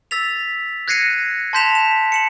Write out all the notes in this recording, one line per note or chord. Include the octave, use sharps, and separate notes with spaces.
E6 A6 B6 F7
F#6 G#6 A#6 C7 C#7 D#7
A5 C6 G6 B6 E7 F7
E7
C#7 E7 F#7